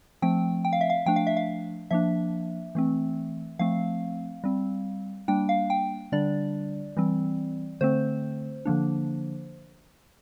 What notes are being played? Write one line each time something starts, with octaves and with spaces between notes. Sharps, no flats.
F3 A3 C4 G5
G5
F5
E5
F5
F3 A3 D4 G5
F5
E5
F5
F3 A#3 D4 E5
E3 A3 C4
F3 A3 C4 F5
G3 C4
G3 A#3 D4 G5
F5
G5
D3 G3 D4 D5
E3 G3 C4
D3 A3 C4 C5
D3 F3 A#3 D4